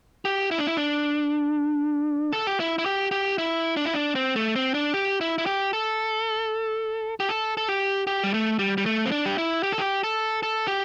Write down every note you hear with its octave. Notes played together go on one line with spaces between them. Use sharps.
G4
E4
D4
E4
D4
A4
G4
E4
E4
G4
G4
E4
D4
E4
D4
C4
A3
C4
D4
G4
E4
E4
G4
A4
G4
A4
A4
G4
G4
G3
A3
G3
G3
A3
C4
D4
G4
E4
G4
A4
G4
A4
A4
G4